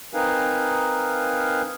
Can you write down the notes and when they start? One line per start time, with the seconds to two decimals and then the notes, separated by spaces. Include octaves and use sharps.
0.14 C4 D#4 A#4 B4 F5 G#5